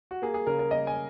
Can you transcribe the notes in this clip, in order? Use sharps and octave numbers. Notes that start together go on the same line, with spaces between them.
F#4
A#3 G#4
G#4
C#3 A#4
A#4
A#3 D#5
G#5